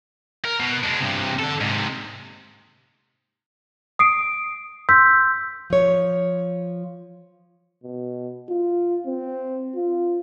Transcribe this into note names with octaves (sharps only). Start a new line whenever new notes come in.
A#4
B2
G#3 D4
G2 C3
D3 A4
G#2 C3
D#6 C7 D7
C6 E6 G6 B6
F3 C#5
B2
F4
C4
F4